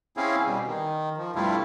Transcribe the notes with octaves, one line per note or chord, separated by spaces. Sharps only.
C4 C#4 E4 G#4 F5
B2 G3
D#3
F3
G2 C3 G3 A3 E4 F4